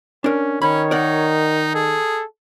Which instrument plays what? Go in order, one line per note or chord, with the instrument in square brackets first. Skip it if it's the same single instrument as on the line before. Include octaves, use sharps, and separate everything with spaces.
[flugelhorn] C#4 [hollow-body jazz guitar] D4 A#4
[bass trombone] D#3 [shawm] C#4 [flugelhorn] C#5 [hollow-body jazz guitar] B5
[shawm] D#4 [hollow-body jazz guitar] A#4 D5 F#5
[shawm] G#4 [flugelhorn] A4